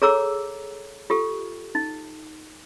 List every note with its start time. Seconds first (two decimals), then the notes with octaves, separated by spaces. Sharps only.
0.02 G#4 A4 C#5 A#5 D6 E6
1.10 F4 G4 A4
1.75 D#4